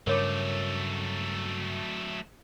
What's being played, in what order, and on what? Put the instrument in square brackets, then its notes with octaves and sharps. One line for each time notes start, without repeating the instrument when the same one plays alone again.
[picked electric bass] G2 C#3 [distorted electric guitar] F#3 A3 [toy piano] A#4 C#5 D6